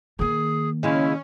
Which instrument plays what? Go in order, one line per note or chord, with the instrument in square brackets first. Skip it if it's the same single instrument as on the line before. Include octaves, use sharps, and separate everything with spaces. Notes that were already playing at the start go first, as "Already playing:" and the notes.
[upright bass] D#3 A#3 [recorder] G#4
[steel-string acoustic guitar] C#3 G#3 F5 [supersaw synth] C#4 [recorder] E4